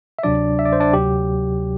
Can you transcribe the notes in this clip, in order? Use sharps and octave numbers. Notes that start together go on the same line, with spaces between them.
E5
D2 C3 F#3 D4 D5
E5
D5
C5
D4 D5
D2 C3 F#3 G4